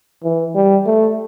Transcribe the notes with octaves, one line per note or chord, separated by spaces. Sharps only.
E3
G3
A3